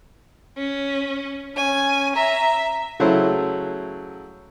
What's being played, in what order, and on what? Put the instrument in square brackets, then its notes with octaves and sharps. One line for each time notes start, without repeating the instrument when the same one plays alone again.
[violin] C#4
[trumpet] C#4 [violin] G#5
[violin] E5 [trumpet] A#5
[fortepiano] C#3 F#3 A3 E4 C5